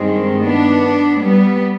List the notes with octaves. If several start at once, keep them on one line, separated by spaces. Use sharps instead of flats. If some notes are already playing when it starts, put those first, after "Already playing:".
Already playing: G2 D#3 G#3 C4
B3 D4
G3 B3